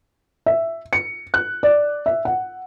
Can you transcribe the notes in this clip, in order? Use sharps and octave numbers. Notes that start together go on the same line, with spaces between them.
E5
C#7
F#6
D5
E5
F#5